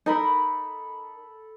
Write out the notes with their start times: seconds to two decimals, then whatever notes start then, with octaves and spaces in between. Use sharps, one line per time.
0.06 D#4 A4 A#4 B5